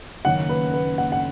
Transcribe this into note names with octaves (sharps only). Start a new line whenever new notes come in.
F#1 F#2 D#3 A#3 C#4 F#5
B4
B4
F#5
F#5